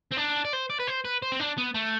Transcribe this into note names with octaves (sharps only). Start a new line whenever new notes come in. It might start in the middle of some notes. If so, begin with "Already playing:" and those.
C4
D4
D5
C5
D5
B4
C5
B4
C5
C4
D4
B3
A3